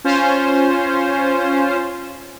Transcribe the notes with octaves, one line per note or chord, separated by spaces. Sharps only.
C#4 F4 C5